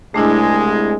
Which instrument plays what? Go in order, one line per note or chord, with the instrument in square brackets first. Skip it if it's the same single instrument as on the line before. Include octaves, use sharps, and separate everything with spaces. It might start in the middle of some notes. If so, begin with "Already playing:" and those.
[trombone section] C2 G#3 [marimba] A3 D4 E4